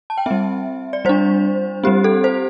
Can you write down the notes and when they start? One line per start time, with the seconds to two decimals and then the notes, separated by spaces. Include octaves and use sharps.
0.10 A5
0.18 G5
0.26 G3 C4 E5
0.93 D5
1.05 G3 D4 C5
1.84 G3 C4 G4
2.04 A4
2.24 C5